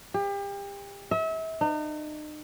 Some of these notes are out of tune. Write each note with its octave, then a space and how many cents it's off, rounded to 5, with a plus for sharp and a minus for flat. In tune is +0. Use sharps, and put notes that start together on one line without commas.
G4 +35
E5 -35
D#4 -40